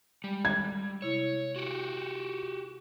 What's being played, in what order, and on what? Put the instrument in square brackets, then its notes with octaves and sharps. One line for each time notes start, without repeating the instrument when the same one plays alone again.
[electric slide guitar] G3 [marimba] G#3
[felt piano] G#6
[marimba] C3 E4 [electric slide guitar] C#5
[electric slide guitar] F#4 G4